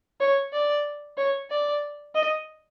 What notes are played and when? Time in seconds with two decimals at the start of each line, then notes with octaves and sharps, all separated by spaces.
0.21 C#5
0.53 D5
1.18 C#5
1.51 D5
2.15 D#5